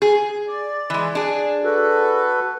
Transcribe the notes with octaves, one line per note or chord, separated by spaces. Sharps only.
G#4
D5
E3 G#3
D4 G#4
F#4 A4 B4